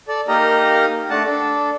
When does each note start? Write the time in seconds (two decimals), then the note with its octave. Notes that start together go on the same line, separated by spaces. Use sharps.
0.08 A4 D5
0.28 A#3 D#4 G4 A#4 D#5 A#5
1.10 A3 D4 F#5 A5
1.25 D4 A4